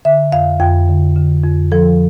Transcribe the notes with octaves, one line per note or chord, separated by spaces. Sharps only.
D3 E5
F2 F5
F2 G5
D3
D3
F2
F3 A4